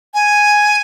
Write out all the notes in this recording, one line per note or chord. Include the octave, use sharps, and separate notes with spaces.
G#5